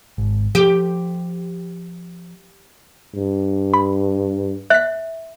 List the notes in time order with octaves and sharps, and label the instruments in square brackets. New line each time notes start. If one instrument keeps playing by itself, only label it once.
[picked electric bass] G#1
[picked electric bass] F3 [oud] G4
[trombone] G2
[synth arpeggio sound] B5
[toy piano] E5 [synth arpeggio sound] F#6 B6